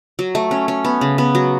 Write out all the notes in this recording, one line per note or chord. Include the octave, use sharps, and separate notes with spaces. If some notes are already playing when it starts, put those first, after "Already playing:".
F#3
A3
C#4
C#4
B3
C#3
B3
F#3